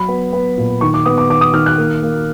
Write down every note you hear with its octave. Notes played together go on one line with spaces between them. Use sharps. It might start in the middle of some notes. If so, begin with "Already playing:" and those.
Already playing: F#3 B5
B3
B3
A#2
D#3 C#6
D6
B3 D#6
D6
D#3 D6
D#6
D#3 F6
F#6
A#3
A#3